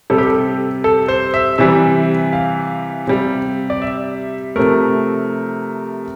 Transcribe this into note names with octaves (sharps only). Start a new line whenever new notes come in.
C3 G3 A4
G4
A4
A4
C5
E5
C3 E3 G3 E5
F5
C3 G3
D5
E5
C3 F3 A3 A#4